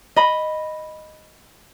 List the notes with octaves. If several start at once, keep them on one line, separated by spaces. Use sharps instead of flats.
D#5 B5